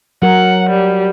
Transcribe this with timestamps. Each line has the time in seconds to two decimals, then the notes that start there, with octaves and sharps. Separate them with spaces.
0.22 F#3 A#4 F#5
0.70 G3